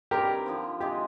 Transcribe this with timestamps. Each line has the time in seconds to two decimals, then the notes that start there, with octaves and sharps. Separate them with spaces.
0.11 G2 D#3 G3 C4 G4 A#4
0.46 D3 F3 C4
0.80 C3 D#3 G#3 G4